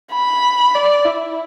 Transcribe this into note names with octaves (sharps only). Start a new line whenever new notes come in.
B5
D5
E4